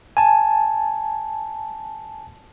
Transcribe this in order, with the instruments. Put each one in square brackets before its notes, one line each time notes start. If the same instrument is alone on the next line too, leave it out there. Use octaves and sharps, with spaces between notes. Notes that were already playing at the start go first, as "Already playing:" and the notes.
[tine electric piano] G#5 A5